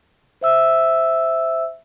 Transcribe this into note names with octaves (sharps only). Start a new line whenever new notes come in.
C5 E5 E6